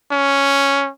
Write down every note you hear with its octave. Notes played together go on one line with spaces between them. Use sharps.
C#4